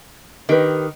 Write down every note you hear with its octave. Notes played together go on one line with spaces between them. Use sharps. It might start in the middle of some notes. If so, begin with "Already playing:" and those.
D#3 G4 B4